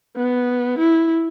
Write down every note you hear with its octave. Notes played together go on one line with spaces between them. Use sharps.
B3
E4